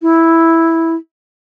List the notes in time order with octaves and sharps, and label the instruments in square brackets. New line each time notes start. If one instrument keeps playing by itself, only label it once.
[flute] E4